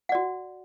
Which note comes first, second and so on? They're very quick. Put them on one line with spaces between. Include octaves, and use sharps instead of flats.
F#5 D5 F#4